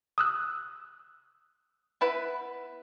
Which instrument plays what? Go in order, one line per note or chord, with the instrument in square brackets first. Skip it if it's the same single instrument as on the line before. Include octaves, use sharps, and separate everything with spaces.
[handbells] D#6 E6 F#6
[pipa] B3 E4 B4